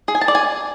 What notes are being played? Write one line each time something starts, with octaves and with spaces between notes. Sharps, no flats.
G#4
G#5
A5
D5
G#5